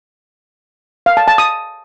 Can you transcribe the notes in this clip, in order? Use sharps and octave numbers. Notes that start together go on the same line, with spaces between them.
F5
A5
A5
D#6